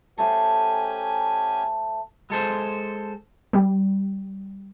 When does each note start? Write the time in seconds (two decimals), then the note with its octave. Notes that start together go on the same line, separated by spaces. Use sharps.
0.18 A3 C#4 G4 C5 G#5
2.30 G#3 A4 C5
3.53 G3